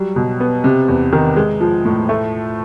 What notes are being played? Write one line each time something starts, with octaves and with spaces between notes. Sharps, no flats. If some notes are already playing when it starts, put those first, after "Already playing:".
Already playing: F#3 G3
B2
B3
C3
E2
D#3
G#3
F3
A2
A3